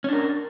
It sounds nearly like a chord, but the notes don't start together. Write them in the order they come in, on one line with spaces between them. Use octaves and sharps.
C#4 D4 A#4